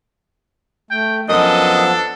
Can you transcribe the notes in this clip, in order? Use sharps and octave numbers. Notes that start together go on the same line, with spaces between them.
A3 G5
F#2 F3 B3 D4 A4 D#5